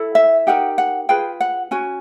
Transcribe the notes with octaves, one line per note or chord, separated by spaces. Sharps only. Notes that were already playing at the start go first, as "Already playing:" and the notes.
Already playing: E4 A4
E5
D#4 G4 A#4 F#5
F#5
F4 G#4 B4 G5
F#5
C#4 F#4 G#5